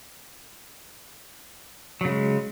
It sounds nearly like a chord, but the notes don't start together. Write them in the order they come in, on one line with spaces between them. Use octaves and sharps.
F#3 C#3 G#3